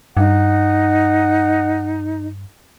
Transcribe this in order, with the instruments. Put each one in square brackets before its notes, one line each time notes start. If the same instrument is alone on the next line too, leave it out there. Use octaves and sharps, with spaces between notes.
[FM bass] G2 [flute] D#4 [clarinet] F#5